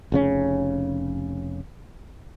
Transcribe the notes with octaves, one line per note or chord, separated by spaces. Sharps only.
F1 C#3 C#4